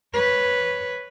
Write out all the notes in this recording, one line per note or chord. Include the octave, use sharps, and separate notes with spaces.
B4 C#5